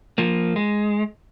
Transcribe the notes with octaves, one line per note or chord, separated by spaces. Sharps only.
F3 A#3
G#3